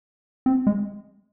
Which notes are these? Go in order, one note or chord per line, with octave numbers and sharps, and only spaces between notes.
C4
G#3